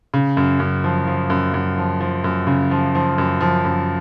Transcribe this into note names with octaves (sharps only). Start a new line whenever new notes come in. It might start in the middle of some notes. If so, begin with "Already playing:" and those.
C#3
F#2
F#2
F3
F3
F#2
F#2
F3
F3
F#2
C#3
F3
F3
F#2
F3
F#2